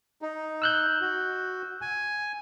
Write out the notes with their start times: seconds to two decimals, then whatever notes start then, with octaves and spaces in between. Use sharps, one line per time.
0.22 D#4
0.62 E6 F#6 G6
1.01 F#4
1.82 G#5